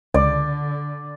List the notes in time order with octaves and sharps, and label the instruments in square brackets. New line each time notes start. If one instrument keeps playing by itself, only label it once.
[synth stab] C#2 [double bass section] D3 [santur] D5